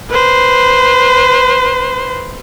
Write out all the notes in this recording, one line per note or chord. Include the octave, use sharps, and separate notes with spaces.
B4 C5